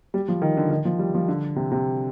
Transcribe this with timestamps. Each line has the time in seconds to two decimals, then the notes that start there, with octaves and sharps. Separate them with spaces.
0.14 G3
0.28 F3
0.42 D#3
0.57 D3
0.70 D#3
0.85 F3
0.99 G3
1.15 F3
1.28 D3
1.56 C3
1.72 C3